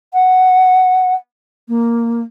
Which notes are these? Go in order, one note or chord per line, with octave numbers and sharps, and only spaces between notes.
F#5
A#3